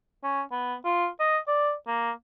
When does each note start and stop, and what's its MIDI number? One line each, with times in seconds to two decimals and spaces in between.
0.23 0.41 61
0.52 0.75 59
0.85 1.07 65
1.20 1.38 75
1.48 1.73 74
1.87 2.11 58